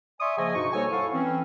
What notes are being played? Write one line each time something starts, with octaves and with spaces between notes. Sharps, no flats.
D5 E5 G#5 C6 C#6 D#6
C#3 F3 A#3 G#4 D#5 G#5
G2 B2 D#4 F#4 C#6
G3 A#3 A4 C5 C#5 G#5
E4 A4 F5 F#5 C#6
E3 C4 C#4